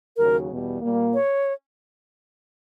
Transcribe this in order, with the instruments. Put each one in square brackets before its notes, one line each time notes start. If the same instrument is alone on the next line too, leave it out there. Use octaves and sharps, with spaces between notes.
[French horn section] D#2 C#3 F#3 [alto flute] A#4
[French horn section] E2 B2 G3
A#2 G3 A#3
[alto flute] C#5